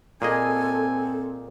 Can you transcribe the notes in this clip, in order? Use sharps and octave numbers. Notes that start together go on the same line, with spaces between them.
A#2 C4 G#4 A4 D#5 G#5